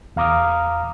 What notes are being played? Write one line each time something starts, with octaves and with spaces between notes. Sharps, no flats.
E2 F5 A#5 D6 D#6 F6